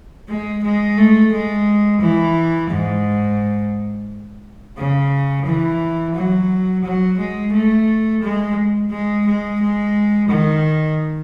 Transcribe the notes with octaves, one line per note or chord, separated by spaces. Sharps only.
G#3
G#3
A3
G#3
E3
G#2
C#3
E3
F#3
F#3
G#3
A3
G#3
G#3
G#3
G#3
D#3